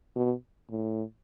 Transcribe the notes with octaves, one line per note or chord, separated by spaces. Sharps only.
B2
A2